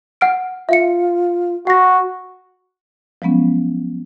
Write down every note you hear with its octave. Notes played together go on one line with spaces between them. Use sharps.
F#5 F6 D7
F4 E5 F5 C#7
F#4 F#5 A#6
F3 F#3 G#3 B3 C#4